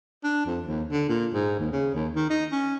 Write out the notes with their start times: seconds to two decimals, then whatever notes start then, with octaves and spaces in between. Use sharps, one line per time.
0.24 D4
0.46 F2
0.66 D#2
0.92 D3
1.09 A#2
1.34 G#2
1.59 D#2
1.72 C#3
1.94 D#2
2.15 D#3
2.30 D#4
2.52 C#4